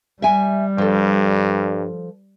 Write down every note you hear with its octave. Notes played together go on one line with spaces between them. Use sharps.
G3 E5 G#5
G2 F3 A4